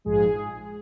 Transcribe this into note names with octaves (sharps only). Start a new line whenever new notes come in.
A#1 G#2 F3 G#3 G#4